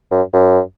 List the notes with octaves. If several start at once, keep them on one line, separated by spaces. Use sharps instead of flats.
F#2
F#2